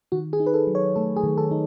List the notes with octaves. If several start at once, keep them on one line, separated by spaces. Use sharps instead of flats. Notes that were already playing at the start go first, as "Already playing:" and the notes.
D#3 F#4
G#4
D#4
B4
A4
F#3
C#5
A3 A4
G#4
D#3
A4
D#4